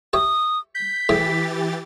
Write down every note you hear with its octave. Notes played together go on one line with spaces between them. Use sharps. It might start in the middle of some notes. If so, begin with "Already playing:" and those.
G4 C#5 E5 D#6
G6 B6
A2 E3 G4 G#4 G5 A6